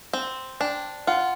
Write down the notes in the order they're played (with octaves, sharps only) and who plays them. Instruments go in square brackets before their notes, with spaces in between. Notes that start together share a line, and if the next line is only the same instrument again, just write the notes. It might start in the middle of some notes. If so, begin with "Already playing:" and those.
[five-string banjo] C4
[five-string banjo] D4 [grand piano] G5
[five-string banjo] F4 [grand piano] F#5